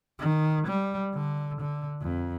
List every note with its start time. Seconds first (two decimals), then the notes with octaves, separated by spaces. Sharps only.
0.19 D#3
0.68 G3
1.14 D3
1.61 D3
2.01 F2